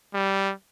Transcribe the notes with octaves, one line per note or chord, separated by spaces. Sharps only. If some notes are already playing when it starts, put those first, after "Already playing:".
G3